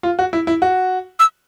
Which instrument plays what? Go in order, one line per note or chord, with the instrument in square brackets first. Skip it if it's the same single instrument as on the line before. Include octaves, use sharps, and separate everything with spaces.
[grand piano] F4
F#4
E4
E4
F#4
[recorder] E6